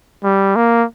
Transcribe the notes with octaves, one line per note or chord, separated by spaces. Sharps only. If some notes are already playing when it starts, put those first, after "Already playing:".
G3
A#3